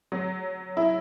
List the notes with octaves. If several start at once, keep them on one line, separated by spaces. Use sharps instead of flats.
F#3
E4